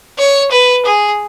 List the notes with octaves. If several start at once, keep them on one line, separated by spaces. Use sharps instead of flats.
C#5
B4
G#4